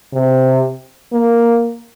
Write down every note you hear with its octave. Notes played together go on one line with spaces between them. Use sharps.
C3
A#3